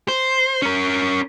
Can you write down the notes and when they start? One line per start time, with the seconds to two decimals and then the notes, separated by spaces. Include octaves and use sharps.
0.08 C5
0.62 C#4 A#4